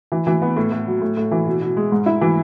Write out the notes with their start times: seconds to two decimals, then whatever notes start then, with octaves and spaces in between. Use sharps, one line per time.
0.12 E3
0.27 E3
0.42 B3
0.57 A2
0.72 A2
0.87 F#3
1.02 A2
1.17 A2
1.32 E3
1.46 B2
1.62 B2
1.77 G#3
1.92 G#2
2.06 E4
2.21 E3